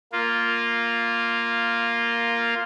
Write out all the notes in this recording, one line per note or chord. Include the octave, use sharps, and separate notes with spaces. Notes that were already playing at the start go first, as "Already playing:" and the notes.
A#3 F4